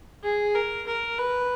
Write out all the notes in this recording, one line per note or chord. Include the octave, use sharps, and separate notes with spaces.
G#4
A#4
A#4
B4